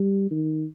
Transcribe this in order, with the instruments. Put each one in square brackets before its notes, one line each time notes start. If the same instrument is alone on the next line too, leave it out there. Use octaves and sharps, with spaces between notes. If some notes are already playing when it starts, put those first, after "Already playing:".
Already playing: [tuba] G3
D#3